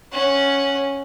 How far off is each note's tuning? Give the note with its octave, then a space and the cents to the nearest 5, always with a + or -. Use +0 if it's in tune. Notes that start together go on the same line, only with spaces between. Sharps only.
C#4 +0 F#5 +0